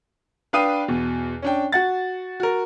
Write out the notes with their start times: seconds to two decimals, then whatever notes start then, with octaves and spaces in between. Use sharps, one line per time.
0.53 D4 B4 F5 G5 D#6 D#7
0.88 E2 B2
1.42 C#4 D4 G5
1.72 F#4 F#5 A6
2.40 F#4 A#4